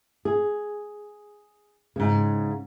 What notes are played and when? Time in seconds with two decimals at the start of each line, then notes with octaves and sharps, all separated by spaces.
0.25 G#4
1.96 G#2 C#3